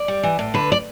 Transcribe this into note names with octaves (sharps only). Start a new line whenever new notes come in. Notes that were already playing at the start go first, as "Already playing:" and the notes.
Already playing: D5
G3
E3
A2
D3 B4
D5